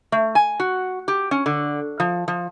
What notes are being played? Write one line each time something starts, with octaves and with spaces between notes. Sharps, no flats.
A3
G#5
F#4
G4
C#4
D3
F3
F3